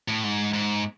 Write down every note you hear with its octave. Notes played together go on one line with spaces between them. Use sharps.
A2
G#2
G#2